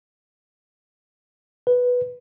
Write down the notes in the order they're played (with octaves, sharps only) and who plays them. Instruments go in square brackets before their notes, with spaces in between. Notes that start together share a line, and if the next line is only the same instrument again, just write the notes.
[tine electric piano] B4